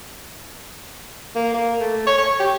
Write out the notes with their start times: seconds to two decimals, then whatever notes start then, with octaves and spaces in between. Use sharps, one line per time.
1.35 A#3
1.54 A#3
1.80 A3
2.07 C#5
2.18 C#5
2.40 G4